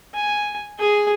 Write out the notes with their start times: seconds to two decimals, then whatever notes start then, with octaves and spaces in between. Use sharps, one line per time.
0.14 G#5
0.79 G#4 G#5